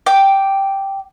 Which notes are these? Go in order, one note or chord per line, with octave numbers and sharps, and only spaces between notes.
G5 D6